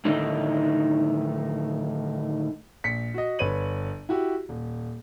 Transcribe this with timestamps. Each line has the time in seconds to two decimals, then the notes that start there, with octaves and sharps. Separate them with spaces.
0.05 A2 D3 D#3 A3 D#4
2.84 A#1 B6 C#7
3.14 F#4 D#5
3.39 G1 B4 C#5 D#7 F#7
4.09 E4 F#4 G4
4.49 D#1